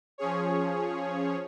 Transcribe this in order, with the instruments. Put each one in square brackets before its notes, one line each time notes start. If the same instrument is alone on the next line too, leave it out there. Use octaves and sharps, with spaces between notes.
[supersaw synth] F3 C#4 G#4 C#5